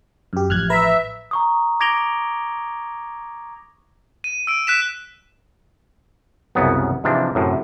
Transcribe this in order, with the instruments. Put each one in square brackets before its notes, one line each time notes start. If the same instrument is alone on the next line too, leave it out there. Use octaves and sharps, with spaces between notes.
[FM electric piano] F#2 G4
[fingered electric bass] A1 F3 [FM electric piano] F6 F#6 G#6
[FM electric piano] B4 A#5 [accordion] E5
[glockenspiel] A#5 C#6 D#6
D6 G#6 A#6 D7 F7 G7
[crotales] D#7
E6 D7
F#6 B6 E7
[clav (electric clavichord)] C2 F#2 C#3 A#3 B3
G#2 C3 E3 F3 D4
F#2 A2 C3